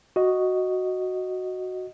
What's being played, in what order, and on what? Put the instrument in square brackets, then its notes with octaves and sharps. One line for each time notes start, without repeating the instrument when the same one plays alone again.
[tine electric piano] F#4 D#5